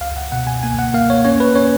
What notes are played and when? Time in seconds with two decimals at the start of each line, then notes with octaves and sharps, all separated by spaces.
0.01 C#2 F5
0.17 F#5
0.32 B2 F#5
0.47 G#5
0.63 A#3 G#5
0.79 F#5
0.94 A#3 F5
1.10 C#5
1.25 C#4 C#5
1.40 B4
1.55 C#4 C#5